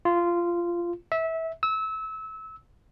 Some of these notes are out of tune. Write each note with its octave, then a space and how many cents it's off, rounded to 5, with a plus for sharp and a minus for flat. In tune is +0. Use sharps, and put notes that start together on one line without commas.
F4 -15
E5 -20
E6 -25